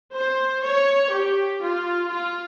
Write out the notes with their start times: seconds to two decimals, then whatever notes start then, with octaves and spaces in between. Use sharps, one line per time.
0.15 C5
0.64 C#5
1.12 G4
1.61 F4
2.10 F4